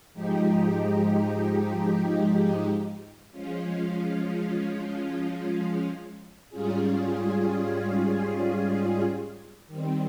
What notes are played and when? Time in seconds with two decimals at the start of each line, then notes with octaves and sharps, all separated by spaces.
0.14 G#2 F3 G#3 D#4 G4
3.32 F3 G#3 C#4 F4
6.50 G#2 G3 C#4 F4 G#4
9.67 D#3 G3 C4